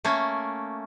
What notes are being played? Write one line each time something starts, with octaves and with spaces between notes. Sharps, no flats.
A3 A#3 C#4